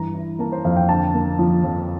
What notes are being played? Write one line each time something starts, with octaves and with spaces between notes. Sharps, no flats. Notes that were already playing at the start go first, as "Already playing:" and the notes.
Already playing: G2 E3 A#5
E4
A#3 A5
C5
F2 F5
G5
D3 A5
A#3
F3
F2